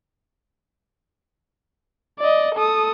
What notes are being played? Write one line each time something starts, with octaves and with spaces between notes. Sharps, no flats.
D5 D#5
A4 D#6